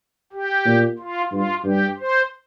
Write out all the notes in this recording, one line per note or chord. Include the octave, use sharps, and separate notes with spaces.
G4
A#2
F4
G2 F4
G2 G4
C5